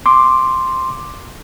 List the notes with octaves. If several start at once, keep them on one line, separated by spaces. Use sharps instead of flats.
C6 D6